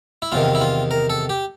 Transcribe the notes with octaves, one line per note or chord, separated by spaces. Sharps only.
E4
E2 C3 D#3 F4
E4
F4
A#4
A4
G4